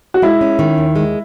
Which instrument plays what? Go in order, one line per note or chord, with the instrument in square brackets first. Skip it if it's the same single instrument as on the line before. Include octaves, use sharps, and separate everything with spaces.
[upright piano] F#4
[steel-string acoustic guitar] G#3 [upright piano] E4
[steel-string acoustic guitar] C#4
D#3
D#2
G#3